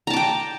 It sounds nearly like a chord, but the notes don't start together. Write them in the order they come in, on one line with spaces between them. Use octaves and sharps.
A#5 A5 D6 G5